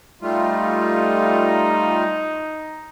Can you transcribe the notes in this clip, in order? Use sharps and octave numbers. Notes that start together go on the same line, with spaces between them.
G3 A3 D#4 F4